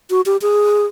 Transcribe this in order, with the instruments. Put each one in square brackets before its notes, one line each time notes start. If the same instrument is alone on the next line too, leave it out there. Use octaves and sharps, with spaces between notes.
[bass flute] F#4
G4
G#4